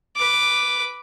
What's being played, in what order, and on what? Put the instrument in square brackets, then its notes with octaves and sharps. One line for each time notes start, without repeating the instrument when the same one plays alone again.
[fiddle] B4 D6